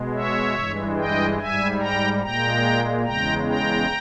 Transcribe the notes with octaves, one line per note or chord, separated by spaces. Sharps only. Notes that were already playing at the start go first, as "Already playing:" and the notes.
Already playing: B2 G#3
C#5 E5
G2 E3 G#3
D#5 G5
G#2 G3 E5 G#5
G5 A#5
A#2 G#3 G5 A#5
E2 C#3 G#3 G5 A#5
G5 A#5